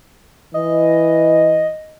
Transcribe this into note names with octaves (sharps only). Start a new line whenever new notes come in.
E3 D#5